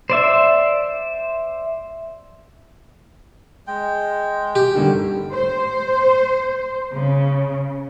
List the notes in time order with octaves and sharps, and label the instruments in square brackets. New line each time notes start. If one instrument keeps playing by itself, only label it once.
[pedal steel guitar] C5 D5 E5
[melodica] G#3 G5
[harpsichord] G4
[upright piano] G2 D3 D#3
[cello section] C5
C#3